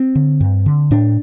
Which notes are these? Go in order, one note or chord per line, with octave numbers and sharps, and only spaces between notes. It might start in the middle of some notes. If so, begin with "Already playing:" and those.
Already playing: C4
D3
G2
D3
A2 D4